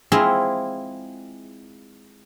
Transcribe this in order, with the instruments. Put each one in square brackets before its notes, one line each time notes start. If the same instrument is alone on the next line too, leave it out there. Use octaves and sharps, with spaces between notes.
[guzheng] G#3 C4 E4 F4 G#4